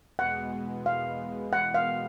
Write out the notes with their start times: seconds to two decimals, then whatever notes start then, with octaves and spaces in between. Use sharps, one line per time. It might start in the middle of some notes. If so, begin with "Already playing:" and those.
0.19 E2 B2 G#3 B3 F#5
0.86 F5
1.53 F#5
1.74 F5